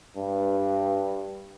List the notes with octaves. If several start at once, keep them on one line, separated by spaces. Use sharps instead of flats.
G2